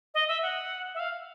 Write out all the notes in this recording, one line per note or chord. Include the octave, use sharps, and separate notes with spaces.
D#5
E5
F#5
E5
F5